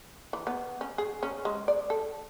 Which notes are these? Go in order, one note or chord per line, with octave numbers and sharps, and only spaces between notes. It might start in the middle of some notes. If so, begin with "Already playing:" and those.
E3
B3
C#4
G#4
C#4
G#3
D5
A4